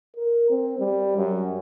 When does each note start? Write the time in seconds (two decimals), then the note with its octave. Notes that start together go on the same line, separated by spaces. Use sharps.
0.17 A#4
0.50 C4
0.79 G3
1.17 F#2